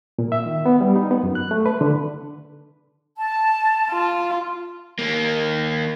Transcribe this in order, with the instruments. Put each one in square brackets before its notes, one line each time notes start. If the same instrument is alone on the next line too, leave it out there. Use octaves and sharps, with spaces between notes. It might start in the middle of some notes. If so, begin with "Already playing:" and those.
[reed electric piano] A#2
E5
D#3
B3
G3
D#4
B3
F#2
F#6
A3
B4
D3
[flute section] A5
[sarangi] F4
[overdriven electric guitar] D#3 A#3